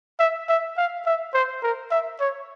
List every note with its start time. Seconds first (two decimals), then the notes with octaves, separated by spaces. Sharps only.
0.19 E5
0.49 E5
0.77 F5
1.06 E5
1.34 C5
1.63 A#4
1.91 E5
2.20 C#5